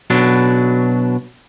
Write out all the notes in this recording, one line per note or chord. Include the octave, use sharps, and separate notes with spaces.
B2 F#3 D4